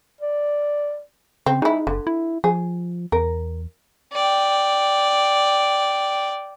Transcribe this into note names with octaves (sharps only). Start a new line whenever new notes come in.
D5
C#3 C4
G#3 D#4 E4
F#1 D3
E4
F3 G#4
E2 A#4
D5 G5